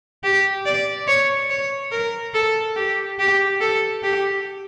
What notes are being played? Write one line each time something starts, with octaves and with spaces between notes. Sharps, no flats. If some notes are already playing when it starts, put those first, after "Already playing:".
G4
D5
C#5
C#5
A#4
A4
G4
G4
A4
G4